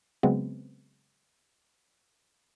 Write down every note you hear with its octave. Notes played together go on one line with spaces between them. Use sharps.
C#3 F#3 G#3 B3 C4